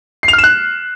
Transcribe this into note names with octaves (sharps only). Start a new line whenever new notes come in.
C7
F7
F6
E7
F#6